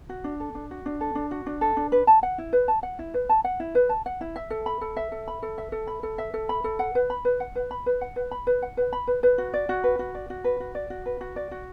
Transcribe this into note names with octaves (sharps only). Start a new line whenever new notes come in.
F#4
D4
A4
D4
F#4
D4
A4
D4
F#4
D4
A4
D4
B4
A5
F#5
E4
B4
A5
F#5
E4
B4
A5
F#5
E4
B4
A5
F#5
E4
E5
A4
B5
A4
E5
A4
B5
A4
E5
A4
B5
A4
E5
A4
B5
A4
F#5
B4
B5
B4
F#5
B4
B5
B4
F#5
B4
B5
B4
F#5
B4
B5
B4
B4
F#4
D5
F#4
B4
F#4
D5
F#4
B4
F#4
D5
F#4
B4
F#4
D5
F#4